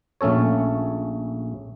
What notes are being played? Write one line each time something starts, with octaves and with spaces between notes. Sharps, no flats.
A#1 A3 C#4 A4 C#5